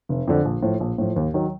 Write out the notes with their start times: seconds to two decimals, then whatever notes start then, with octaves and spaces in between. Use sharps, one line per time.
0.09 F1
0.27 F2 D3
0.45 A#1
0.63 A2 F3
0.80 A#1
0.98 A2 F3
1.16 D#2
1.34 D#3 F#3